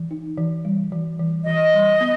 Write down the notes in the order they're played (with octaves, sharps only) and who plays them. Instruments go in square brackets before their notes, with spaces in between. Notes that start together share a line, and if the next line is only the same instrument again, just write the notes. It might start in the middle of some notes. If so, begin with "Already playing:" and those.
Already playing: [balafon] E3
D#4
E3
G3
E3
E3
[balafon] E3 [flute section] D#5
[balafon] G3
B3